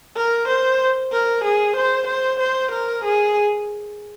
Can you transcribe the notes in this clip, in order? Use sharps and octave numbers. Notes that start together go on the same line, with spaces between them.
A#4
C5
A#4
G#4
C5
C5
C5
A#4
G#4